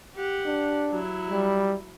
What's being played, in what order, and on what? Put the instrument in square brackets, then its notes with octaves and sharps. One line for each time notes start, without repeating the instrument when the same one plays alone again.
[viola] G4 F#5
[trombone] D4
[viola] F#3 E4
[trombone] G3